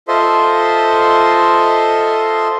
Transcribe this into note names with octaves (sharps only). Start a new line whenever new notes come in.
F4 A4 C5 D#5 E5 C6